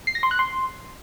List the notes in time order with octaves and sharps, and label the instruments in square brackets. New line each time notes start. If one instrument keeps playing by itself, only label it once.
[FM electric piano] C7
A#6
C6
F#6
C6